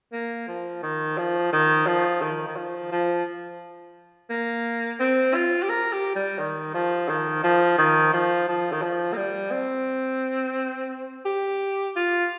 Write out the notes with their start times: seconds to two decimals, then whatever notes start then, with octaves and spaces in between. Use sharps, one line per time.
0.12 A#3
0.48 F3
0.83 D#3
1.18 F3
1.53 D#3
1.87 F3
2.21 D#3
2.47 D#3
2.56 F3
2.92 F3
4.30 A#3
5.00 C4
5.35 F4
5.63 G4
5.69 A#4
5.92 G4
6.15 G3
6.39 D#3
6.74 F3
7.08 D#3
7.43 F3
7.78 D#3
8.13 F3
8.48 F3
8.72 D#3
8.82 F3
9.13 A#3
9.17 G3
9.51 C4
11.25 G4
11.96 F4